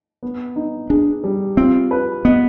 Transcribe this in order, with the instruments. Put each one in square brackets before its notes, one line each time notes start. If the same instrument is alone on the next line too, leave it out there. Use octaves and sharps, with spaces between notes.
[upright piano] B3
D#4
[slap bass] D4 [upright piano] G#4
[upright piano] G3
[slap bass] C4 [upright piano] F4
[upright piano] B4
[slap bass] B3 [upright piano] D#5